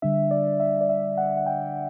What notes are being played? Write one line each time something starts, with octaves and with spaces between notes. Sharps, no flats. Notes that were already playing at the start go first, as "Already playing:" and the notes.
D3 G3 D4 E5
D5
E5
D5
E5
F#5
F#5
G5